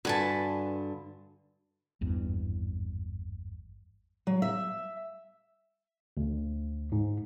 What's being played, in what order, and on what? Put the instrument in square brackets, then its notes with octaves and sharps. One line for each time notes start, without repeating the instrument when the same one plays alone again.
[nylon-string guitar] G2 D3 F#4 [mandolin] B4 G#5 A5
[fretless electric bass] G#1 E2 G2
[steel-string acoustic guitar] F#3
E5
[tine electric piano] D2
G#2